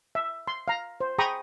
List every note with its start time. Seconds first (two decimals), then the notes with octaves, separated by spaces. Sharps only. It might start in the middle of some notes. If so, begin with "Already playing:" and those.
0.15 E5
0.48 C6
0.68 F5 A#5
1.01 C5
1.18 G#4 G5 A#5 B5 C#6 D#6